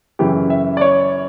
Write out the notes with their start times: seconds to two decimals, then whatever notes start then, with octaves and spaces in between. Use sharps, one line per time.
0.19 F#2 C#3 E3 G4
0.50 E5
0.77 D5
0.81 C#5